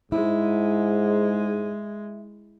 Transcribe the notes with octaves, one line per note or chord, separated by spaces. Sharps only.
G#2 G#3 E4